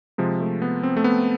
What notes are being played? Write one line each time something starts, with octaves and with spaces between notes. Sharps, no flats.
C3 F3 G#3
A3
B3
C4
A3
B3